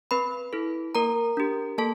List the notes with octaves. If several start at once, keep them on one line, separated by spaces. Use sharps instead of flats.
C4 B4 B5
E4 A4
A#3 A#4 A#5
D4 G4
A#3 A4 A5